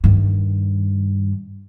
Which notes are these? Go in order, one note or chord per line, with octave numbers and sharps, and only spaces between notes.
G2 D#3